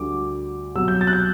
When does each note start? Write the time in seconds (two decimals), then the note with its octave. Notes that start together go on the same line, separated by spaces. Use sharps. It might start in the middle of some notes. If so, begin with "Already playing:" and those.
Already playing: D2 D3 G3 D6
0.75 C2 B2 F#3 E6
0.88 G6
1.01 A6
1.07 F#6
1.13 G6